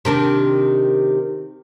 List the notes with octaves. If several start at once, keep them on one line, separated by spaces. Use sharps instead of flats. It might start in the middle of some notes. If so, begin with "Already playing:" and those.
C3 D#3 D4